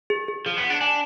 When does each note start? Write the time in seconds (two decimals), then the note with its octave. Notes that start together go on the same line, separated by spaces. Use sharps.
0.10 G#4
0.28 G#4
0.46 F3 G#4
0.58 B3
0.64 F#5
0.70 D4
0.81 D4 G#5